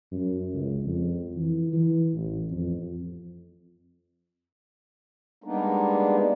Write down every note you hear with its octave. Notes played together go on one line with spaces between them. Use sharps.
F#2
C#2
F2
E3
E3
A1
F2
G3 G#3 A#3 B3 D4 D#4